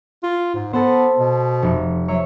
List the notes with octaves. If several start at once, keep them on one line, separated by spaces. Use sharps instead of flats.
F4
G#2
B3 A4 C5
B2
F1 C#7
F#3 C#5 E5